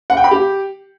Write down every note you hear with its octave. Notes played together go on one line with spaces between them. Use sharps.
F#5
G5
B5
G4